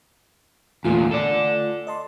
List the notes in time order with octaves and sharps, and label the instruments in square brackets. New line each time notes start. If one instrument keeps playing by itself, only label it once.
[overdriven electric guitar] E2 A#2 [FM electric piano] A3 F4 G#5
[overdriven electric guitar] A4 D5
[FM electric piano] D#5 A5 C6